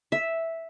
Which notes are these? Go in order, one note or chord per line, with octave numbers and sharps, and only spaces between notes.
E5